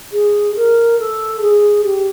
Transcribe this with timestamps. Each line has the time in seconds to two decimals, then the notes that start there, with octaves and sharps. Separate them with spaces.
0.12 G#4
0.55 A#4
0.98 A4
1.41 G#4
1.84 G4